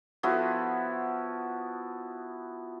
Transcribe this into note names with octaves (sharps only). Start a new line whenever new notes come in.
F3 B3 E4 F#4